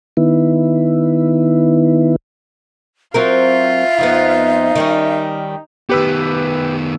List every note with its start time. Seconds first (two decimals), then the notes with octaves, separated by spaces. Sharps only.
0.17 D#3 B3 E4
3.14 F#3 C4 F4 A#4 E5
3.99 F2 F3 B3 D#4
4.76 D#3 G3 C#4
5.89 D#3 B3 G4 B4 E6